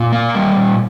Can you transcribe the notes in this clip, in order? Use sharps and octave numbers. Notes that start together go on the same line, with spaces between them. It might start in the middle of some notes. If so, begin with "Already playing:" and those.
Already playing: A#2
A#3
G3
A#2